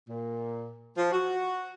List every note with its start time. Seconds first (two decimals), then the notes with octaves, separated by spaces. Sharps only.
0.08 A#2
0.97 F3
1.12 F#4